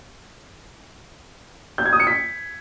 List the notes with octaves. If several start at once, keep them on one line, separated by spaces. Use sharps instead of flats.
G6
G#6
D#6
C#7
B6